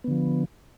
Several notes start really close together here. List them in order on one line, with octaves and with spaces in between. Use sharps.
B3 D3 F3